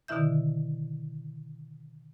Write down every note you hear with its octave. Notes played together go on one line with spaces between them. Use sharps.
B2 D3 D#3 E4 E5 G6